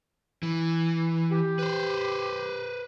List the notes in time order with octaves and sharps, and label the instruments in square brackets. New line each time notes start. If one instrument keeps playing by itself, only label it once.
[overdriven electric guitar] E3
[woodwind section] G4
[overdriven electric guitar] B4 C5